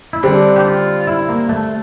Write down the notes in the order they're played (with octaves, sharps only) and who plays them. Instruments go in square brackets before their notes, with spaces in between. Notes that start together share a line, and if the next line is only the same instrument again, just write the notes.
[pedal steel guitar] E4
[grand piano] D3 G3 C4 [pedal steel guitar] D4
[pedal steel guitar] G4
F4
E4
A#3
A3